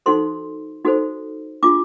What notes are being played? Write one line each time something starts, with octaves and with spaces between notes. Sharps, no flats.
D#4 F#4 A4 C5 C6
D#4 F#4 A4 C5
D4 F4 G#4 D6